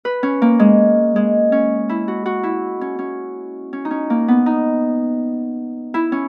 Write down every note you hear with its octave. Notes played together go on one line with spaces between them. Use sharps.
B4
C#4
A#3
G#3
G#3
C#4
E4
F#4
F#4
E4
C#4
C#4
C#4
D#4
C#4
A#3
B3
D#4
E4
C#4